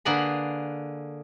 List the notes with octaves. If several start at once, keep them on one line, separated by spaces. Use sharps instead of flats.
D3 A#3 G#4 B4 A#5 B5